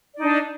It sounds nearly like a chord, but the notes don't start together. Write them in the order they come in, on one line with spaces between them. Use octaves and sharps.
D5 D#4 D4